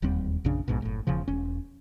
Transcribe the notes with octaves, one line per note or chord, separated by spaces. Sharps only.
E1 D#2 G3 C4
A#1 F#2 C#3 D4
A#1 G#2 B2
F#1 A2
E1 E2 C#3 F3
E1 C#4